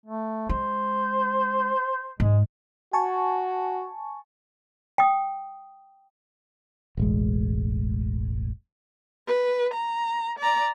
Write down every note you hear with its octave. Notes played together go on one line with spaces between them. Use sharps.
A3
G#3 C5
G#2 G#3
F#4 G#5 A5 C#6
G5 D#6
E1 A1 G#3
B4
A#5
D5 A#5